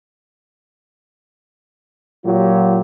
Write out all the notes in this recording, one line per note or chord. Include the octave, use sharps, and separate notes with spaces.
A#2 F#3 F4 G4